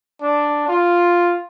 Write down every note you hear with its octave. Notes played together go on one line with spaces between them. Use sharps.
D4
F4